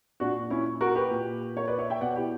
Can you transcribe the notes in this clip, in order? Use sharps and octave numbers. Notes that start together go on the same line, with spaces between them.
A#2 D4 F#4
C#4 E4
F#4 A#4
G4 B4
A#2
A#4 C#5
B4 D5
C#5 E5
E5 G5
B2 D5 F#5
E4 G4